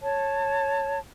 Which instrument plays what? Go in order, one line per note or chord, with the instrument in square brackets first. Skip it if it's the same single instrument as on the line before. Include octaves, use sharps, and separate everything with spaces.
[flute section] C#5 A5